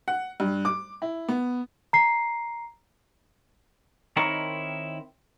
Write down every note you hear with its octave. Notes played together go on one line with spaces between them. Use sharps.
F#5
G2
D6
E4
B3
A#5 C7
D#3 C4 D#4 E4 A#4 C#5